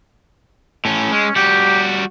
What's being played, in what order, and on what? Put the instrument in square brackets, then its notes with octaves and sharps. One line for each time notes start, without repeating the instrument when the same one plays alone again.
[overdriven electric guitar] A2 C#4
[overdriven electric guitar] G#3 [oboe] C#4
[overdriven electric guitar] G3 F#4 [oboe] G4